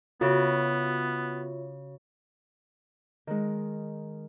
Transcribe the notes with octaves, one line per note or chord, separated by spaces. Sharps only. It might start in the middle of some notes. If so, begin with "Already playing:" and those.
C#3 B3 F4 F#4 C#5 E5
D#3 G#3